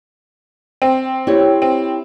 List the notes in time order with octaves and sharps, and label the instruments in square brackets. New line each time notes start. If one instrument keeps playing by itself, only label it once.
[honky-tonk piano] C4
[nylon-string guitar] E4 G4 C#5
[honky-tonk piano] C4